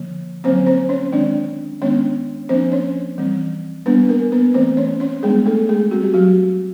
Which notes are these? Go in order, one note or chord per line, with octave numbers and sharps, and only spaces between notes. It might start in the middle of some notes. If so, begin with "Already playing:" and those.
Already playing: D3 F3 A#3
D3 F#3 A#3 C4 C#4 C5
C4 C5
C#4 C#5
D#3 G#3 C4 D4 D5
D#3 G#3 B3 C#4 D4 C#5
F3 A#3 C4 D4 C5
C#4 C#5
E3 G3 C4
G3 A#3 B3 D4 B4
A#3 A#4
B3 B4
E3 A3 C4 C5
C#4 C#5
C#4 C#5
G3 G#3 B3 D4 G#4
A3 A4
G#3 G#4
G3 C4 F#4
G4
F#3 F#4